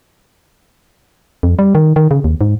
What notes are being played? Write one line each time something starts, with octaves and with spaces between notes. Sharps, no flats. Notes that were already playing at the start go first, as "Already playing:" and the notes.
F2
G3
D#3
D#3
C#3
D#2
G#2